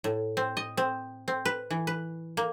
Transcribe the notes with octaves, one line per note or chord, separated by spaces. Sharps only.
A2
C4
D#5
C4
C4
B4
E3
B4
A#3